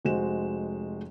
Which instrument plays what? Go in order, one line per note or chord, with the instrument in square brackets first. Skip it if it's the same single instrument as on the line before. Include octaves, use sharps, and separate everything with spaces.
[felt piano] F1 G#3 F#4 C5 E7